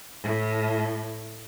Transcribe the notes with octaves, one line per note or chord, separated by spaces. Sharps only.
A2